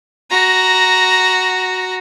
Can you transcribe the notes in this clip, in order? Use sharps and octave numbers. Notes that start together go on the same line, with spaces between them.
F#4 A#5